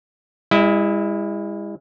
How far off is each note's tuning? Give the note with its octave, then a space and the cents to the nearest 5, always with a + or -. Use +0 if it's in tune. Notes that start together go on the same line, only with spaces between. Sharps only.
G#3 -45 E4 +0 D#5 +40